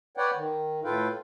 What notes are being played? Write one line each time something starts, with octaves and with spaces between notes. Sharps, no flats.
B4 C#5 D5 F#5 G5
D#3
A2 F4 A4 B4 F5 G5